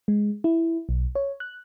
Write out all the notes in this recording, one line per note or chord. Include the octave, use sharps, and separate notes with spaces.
G#3
E4
B1
C#5
F#6